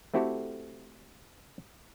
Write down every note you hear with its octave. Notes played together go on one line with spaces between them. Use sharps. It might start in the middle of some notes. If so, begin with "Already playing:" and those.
A3 C4 E4 F#4 G4 A4